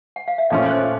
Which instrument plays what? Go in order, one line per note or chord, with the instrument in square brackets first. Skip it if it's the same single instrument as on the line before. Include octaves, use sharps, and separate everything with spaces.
[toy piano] F#5
F5
E5
[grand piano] A#2 F3 A3 C#4 F4 [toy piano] D#5
[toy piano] C#5
C5